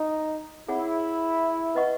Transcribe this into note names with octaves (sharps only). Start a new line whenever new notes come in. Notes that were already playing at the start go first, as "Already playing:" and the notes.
Already playing: D#4
E4 G#4 C#5 F#5
B4 D#5 F#5 C#6